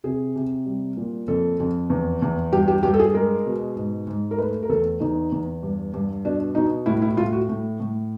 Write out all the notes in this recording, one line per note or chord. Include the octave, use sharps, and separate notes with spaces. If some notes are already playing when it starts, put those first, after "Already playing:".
C3 G#4
C3
G3
A#2
F2 A4
F2
E2
E2
G2 G4
G4
G2 G4
A4
G#4
G#3 A#4
B2
G#2
G#2
A#4
A3 B4
A#4
E2 A4
E2 D#4
E2
G2
G2
B2 D4
B2 D#4
A2 E4
E4
A2 F4
F#4
A2
A2